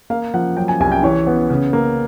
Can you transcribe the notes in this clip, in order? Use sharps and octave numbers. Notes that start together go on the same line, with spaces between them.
A#3 F5
F3 F#5
F#3 G5
G#5
C2 G#5
G5
E3 C#5
B3
C#3
A#3